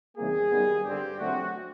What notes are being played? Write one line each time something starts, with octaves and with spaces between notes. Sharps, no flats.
E2 C3 D#3 G3 A#3 G#4
F#2 D#3 G3 B3
G2 D3 G3 C4 G4
F2 D3 F#3 A3 C4 F#4